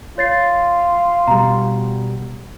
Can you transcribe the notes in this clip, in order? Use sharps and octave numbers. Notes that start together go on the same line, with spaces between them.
F4 C#5 A6 C7
B2 G3 A#5